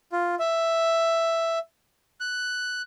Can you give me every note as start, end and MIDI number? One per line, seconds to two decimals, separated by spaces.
0.12 0.35 65
0.39 1.59 76
2.20 2.82 90